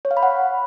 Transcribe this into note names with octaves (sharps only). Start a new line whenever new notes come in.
C#5
F5
B5
F#5